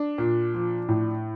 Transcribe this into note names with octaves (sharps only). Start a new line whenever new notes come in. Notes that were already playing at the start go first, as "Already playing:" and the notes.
Already playing: D4
A#2
F3
A2